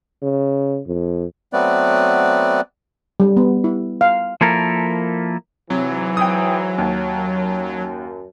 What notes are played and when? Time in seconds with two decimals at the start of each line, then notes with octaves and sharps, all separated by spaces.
0.23 C#3
0.87 F2
1.53 F#3 A3 B3 C4 B4 D5
3.20 G3
3.37 B3
3.64 E4
4.01 F5
4.41 F3 A#3 E4 A4 A#4
5.70 G#2 C3 E3 F#3
6.17 G5 D#6
6.78 D#2
7.19 F#2